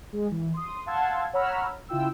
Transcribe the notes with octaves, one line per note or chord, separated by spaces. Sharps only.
G#3
E3
C6 D#6
F5 F#5 A5 C6 E6 G#6
C#5 F#5 A#5 B5 E6 F6
C#3 E4 F4 G5 E6